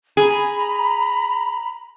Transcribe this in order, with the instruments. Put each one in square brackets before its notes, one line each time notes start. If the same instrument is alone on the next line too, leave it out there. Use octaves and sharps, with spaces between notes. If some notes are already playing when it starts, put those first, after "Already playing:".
[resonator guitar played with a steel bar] G#4 [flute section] A#5 B5